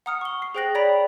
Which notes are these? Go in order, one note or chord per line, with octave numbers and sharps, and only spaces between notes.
F#5 A#5 D#6 F6 C#7
C#6 G7
C7
G#4 C5 G5 F#6 A#6 F#7
C#5 D5 G5 A#5 B5 B6